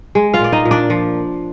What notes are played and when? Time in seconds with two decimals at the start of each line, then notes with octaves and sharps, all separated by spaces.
0.15 G#3
0.34 F4 F5
0.40 A#2 D5
0.52 D#4 D#5
0.65 A#2
0.71 D4 D5
0.90 F3